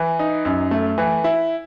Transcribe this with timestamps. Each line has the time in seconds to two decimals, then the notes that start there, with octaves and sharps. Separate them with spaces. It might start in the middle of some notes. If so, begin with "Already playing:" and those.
Already playing: E3
0.19 D#4
0.45 F#2
0.71 A3
0.98 E3
1.24 E4